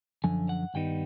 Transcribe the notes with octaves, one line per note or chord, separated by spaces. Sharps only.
F#2 D3 F3 G#5
F#5
G2 D#3 G3 B3 D#4 G5